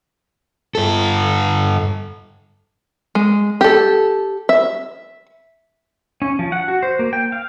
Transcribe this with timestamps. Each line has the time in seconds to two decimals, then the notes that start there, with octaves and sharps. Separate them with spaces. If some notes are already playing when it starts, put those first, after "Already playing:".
0.75 G2 A4
3.15 G#3
3.61 G4 A4
4.49 E5
6.22 C#4
6.39 F3
6.52 F#5
6.68 F#4
6.83 C5
6.99 A#3
7.13 G5
7.32 F5